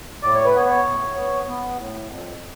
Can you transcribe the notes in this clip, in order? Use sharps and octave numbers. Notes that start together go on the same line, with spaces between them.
A2 D5
C#5
B4
B3 C#5
C#5
A2
B3
B3
A2
F2